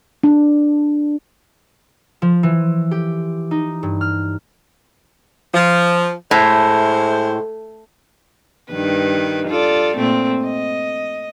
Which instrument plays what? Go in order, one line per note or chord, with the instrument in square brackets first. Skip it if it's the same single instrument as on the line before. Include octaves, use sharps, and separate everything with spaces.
[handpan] D4
[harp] F3
E3
G4
D#4
G2
F6
[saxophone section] F3
[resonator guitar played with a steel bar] A2 [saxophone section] G#3 A3 C5
[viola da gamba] G2 D#3 B4
F4 A4 D5
A#2 A3 C4
D#5